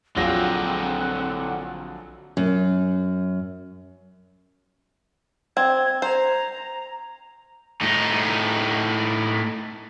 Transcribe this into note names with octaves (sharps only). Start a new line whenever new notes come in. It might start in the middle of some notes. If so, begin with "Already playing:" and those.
A#1 D3 F#3 C4 F4 G#4 F#5 A#6
F#2
C4 G#6
C5 A#5
A2 D#4